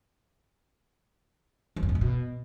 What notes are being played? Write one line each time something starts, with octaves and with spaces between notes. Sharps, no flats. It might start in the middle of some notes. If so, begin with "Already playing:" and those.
E2
F2
G#2
A#2
B2